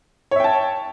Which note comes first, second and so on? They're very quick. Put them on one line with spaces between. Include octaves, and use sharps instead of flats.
C#5 E5 G5 A5